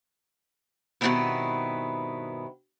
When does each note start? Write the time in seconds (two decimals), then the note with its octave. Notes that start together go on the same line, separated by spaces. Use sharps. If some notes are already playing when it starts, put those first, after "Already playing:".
1.01 G2 B2 D#3 B3 C4 E4